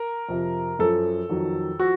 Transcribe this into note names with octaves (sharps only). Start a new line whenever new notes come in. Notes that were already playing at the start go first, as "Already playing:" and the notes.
Already playing: A#4
F2 C3 F3
F#2 F3 A4
F2 D#3 F#3
F3 F#4